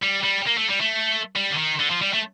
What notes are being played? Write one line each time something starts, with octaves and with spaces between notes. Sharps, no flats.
G3
G3
A#3
A3
G3
A3
G3
D3
D#3
D3
F3
G3
A3